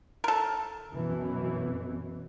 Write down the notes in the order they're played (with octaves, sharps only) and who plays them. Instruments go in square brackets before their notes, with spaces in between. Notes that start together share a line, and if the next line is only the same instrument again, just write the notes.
[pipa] A4 A#4
[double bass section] F#2 B2 E3